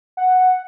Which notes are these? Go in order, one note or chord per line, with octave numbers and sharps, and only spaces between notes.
F#5